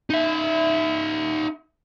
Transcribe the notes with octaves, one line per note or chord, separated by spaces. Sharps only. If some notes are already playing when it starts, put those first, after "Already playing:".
D#4 E5